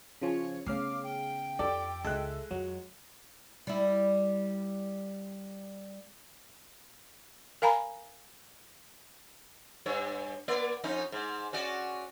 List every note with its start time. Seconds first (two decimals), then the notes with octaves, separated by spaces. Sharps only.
0.22 C#3 F3 C#4 C#5
0.66 C#3 A3 B3 F5 D6 C7
1.03 G5
1.59 F2 G4 A4 D5
2.04 C#2 G#3 A4 E5 F#6
2.51 F2 F#3
3.67 G3 E4
7.62 A#4 F5 G#5 A#5 B5
9.86 G2 C#5
10.48 A#3 D5
10.84 F2 C#4 D#4
11.12 G#2
11.53 C#4 F#4 D5